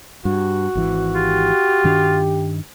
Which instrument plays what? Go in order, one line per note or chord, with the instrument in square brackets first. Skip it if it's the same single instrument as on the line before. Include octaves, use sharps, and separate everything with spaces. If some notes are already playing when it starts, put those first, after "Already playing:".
[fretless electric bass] G2 [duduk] F#4
[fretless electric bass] G#1 E3
[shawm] F4 [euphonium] G4
[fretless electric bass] G2 D#3 D4